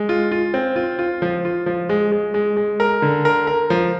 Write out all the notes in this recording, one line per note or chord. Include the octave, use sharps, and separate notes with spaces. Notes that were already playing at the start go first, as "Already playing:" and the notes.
Already playing: G#3
F4
F4
C4
F4
F4
F3
F4
F3
G#3
G#3
G#3
G#3
A#4
D3
A#4
A#4
F3